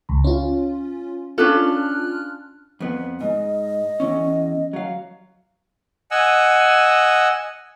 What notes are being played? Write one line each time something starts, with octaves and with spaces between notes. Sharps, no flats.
C#2
C#4 F4
C#4 D4 F4 A4 F6 F#6
F2 B3
G#2 D#5
E2 C#4
F#3 F5
D#5 F#5 G#5 E6